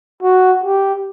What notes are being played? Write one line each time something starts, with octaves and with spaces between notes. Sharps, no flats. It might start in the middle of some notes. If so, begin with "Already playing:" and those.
F#4
G4